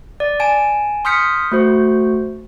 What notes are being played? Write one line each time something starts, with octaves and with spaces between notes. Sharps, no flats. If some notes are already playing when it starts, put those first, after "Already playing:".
D5
G#5 A5 D7
C6 D#6 F6 G6 B6 C#7
A3 F#4 C5